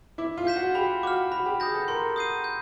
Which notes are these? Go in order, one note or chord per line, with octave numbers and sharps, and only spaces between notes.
E4 D6
F4
G6 B6 E7
F#4
G4 B5
F#4 D6 F6
F#4 B5
G4
G#4 D#6 G6 A#6
A4
A#4 C6
D#6 G6 C7 D#7
G6